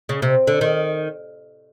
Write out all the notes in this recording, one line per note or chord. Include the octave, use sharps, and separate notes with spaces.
C#3
C3
D3
D#3